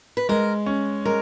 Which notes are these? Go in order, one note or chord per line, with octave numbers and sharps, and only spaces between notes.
B4
G#3 A#4
C#4
G#3 A#4